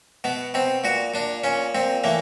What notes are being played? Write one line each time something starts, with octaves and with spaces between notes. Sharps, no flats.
B2 B3
B2 C4
A#2 F#4
A#2 D4
A#2 C#4
A#2 C4
A2 E3 A#3